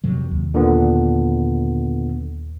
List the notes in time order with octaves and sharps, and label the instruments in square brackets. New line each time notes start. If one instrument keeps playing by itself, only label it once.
[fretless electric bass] F2 C3 F#3
D#2
[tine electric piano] A#2 D3 B3